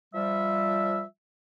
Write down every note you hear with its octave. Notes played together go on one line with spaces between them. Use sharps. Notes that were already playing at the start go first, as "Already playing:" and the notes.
F3 G3 E5